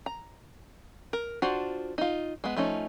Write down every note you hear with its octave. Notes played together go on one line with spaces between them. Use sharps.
A#5
A#4
D4 F4 F#4 C5
D#4 F4
G#3 B3
F3 A3 C#4 D#4